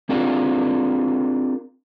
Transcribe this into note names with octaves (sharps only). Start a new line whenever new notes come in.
C4 D4 F4 G4 G#4 A#4